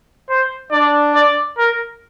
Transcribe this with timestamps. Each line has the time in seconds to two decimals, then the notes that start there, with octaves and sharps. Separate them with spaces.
0.30 C5
0.72 D4 D5
1.15 D5
1.58 A#4